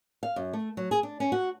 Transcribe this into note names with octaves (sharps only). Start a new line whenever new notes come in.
F5
F#2
A3
F#3
G#4
D4
C#4
F#4